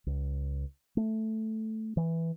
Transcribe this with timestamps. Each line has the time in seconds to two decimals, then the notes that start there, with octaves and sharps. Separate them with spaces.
0.07 C#2
0.97 A3
1.97 E3